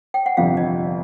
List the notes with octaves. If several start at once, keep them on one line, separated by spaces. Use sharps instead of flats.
G5
F#5
G1 F2 C3 F3 F5
D#5